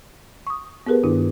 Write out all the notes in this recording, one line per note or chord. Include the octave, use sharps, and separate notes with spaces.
C#6 D#6
B3 G4 G#4 A#4 B4
G2 D#3 D4 E4